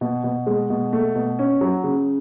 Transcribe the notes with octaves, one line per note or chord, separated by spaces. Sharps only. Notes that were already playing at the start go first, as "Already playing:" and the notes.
B2
B2
G#3
B2
A3
B2
C#4
F#3
C#3